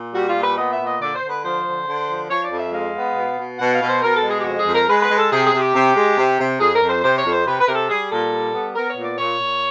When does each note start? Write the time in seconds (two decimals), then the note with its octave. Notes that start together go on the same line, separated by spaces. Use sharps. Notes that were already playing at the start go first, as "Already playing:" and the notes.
Already playing: A#2
0.14 G3 F#4
0.29 F4
0.36 A#2
0.43 B4
0.57 B3 D#5
0.72 E5
0.79 A#2
0.86 D#5
1.01 D3 D5
1.15 C5
1.22 D3
1.29 B4
1.44 F3 C5
1.66 D3
1.87 D3
2.08 F3
2.29 F3 C#5
2.44 D5
2.51 F2
2.58 E5
2.73 G#3 F5
2.95 B3
3.16 B2
3.38 B2
3.59 B2 F#5
3.73 F5
3.81 B2
3.87 C5
4.02 B2 A#4
4.16 A4
4.23 G#3
4.31 G#4
4.39 G4
4.44 F2 F#4
4.59 G#4
4.66 F2
4.73 A#4
4.88 G#3 B4
5.02 B4
5.09 G#3
5.17 A4
5.31 C3 G#4
5.46 G#4
5.52 C3
5.59 G4
5.74 C3
5.95 G#3
6.17 C3
6.39 C3
6.60 F2 G#4
6.74 A#4
6.81 F2
6.89 C5
7.03 C3 C5
7.18 C#5
7.24 F2
7.32 C5
7.46 C3 B4
7.61 B4
7.68 C3 A#4
7.74 A4
7.89 G3 G#4
8.11 A#2 A4
8.32 G3
8.54 B3
8.75 B3 A#4
8.90 C#5
8.97 A#2
9.03 D5
9.18 A#2 C#5
9.40 A#2